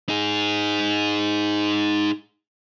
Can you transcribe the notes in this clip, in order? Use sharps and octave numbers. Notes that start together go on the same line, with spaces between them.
D#4 G#4